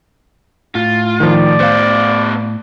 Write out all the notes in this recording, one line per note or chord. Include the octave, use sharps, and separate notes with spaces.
A2 F4
D#3 F3 D5
B3 G4 C5 F5